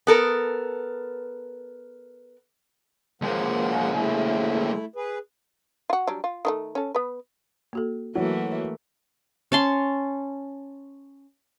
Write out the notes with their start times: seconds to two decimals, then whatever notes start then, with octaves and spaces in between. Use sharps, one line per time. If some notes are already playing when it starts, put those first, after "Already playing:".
0.07 B3 A4 A#4
3.22 D#2 F3 G#3 A#3 F#5
3.94 A3 E4
4.96 G#4 B4
5.90 F4 F#4
6.07 F#3 G3 D4
6.24 F4
6.45 D#3 F3 A3
6.75 C#4 A4
6.95 B3 B4
7.73 A#3 F#4 A4
8.15 E3 F#3 A3 A#3 E4
9.52 C#4 A5 C6